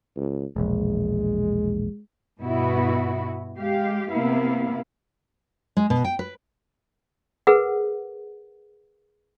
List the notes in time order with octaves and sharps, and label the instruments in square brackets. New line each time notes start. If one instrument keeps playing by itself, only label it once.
[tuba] C#2
[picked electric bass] E1 A#1 [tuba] G#3
[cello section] G2 B2 B3 E4 F#4
G#3 G4 F5
C3 A#3 B3 E4 F5
[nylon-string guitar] G#3
B2
G5
B4
[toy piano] G#4 A#4 B4 F#5